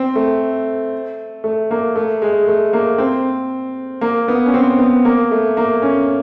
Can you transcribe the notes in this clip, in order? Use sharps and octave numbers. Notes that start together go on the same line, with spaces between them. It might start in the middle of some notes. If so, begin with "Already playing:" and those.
Already playing: C4
A3
A3
A#3
A3
G#3
A3
A#3
C4
A#3
B3
C#4
C4
B3
A#3
A3
A#3
C#4